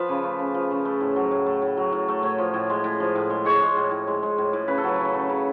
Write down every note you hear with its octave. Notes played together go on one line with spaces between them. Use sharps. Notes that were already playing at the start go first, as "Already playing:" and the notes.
Already playing: F3 B4
C#3
A3
C#3
F3
C#3
A3
A2
F#3
A2
A3
A2
F#3
A2
A3
A2 C#5
F3
A2
G#3
A2
F3
A2
G#3
G#3 C#5
G#3
A2
A2
G#3
G#3
A2
A2
C#3 B4
A4
F#3 B4
C#3
A3
C#3